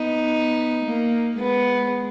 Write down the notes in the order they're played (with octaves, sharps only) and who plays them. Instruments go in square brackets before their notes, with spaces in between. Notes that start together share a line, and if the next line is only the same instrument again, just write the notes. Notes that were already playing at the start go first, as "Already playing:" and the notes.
Already playing: [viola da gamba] B3 [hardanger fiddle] D#4
[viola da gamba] A#3
[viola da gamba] G#3 [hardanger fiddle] B3